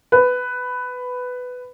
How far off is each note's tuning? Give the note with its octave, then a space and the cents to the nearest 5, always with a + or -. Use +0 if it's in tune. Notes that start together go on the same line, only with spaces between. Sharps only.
B4 +10